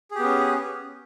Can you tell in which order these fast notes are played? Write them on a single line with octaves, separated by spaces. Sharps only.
G#4 G4 B3 C#4